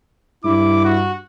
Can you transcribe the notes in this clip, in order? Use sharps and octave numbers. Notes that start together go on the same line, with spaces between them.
G2 E4 D6
F#4